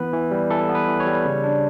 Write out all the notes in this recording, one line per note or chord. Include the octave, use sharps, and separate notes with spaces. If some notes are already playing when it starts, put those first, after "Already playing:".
Already playing: E3 B3 B4
E3
G3
E3 A4
B3
B4
E3
C#5
G3
C#3
D4